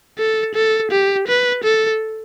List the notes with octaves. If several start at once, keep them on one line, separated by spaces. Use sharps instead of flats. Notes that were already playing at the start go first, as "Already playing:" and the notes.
A4
A4
G4
B4
A4